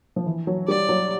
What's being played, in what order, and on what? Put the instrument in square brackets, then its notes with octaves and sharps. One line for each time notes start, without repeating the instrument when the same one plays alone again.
[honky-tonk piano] F3
E3
F#3
[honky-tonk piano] G3 [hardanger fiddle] D5
[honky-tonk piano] F#3